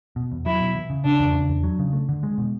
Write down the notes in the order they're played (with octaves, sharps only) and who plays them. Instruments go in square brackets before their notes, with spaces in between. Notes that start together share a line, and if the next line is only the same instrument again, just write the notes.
[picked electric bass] B2
E2
[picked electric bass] F#3 [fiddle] E4
[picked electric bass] B2
E3
C#3
[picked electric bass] C#3 [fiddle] D4
[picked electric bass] E2
C#3
E2
F#3
C#3
A3
D3
G#3
B2